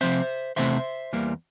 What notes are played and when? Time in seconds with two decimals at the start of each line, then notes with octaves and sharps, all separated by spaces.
0.01 C3 F3 C4 C5 E5
0.56 E2 C3 E3 A3 C4 C5 E5
1.13 E2 E3 G3 A#3